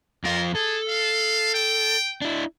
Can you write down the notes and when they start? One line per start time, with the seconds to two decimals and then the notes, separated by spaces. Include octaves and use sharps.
0.24 F2 F3 F4 A#4
0.55 G#4 A4
0.88 F5
1.54 G5
2.22 D4 E4